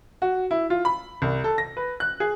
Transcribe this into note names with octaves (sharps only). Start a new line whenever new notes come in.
F#4
E4
F4
B5
C2
A4
A#6
B4
F#6
G#4